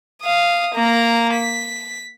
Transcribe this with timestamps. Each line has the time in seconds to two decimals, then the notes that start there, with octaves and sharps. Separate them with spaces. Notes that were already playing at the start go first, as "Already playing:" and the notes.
0.22 F5 D#6
0.75 A#3 A#5
1.34 B6